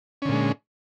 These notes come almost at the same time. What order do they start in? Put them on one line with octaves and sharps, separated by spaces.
C#4 D3 A#2 G#3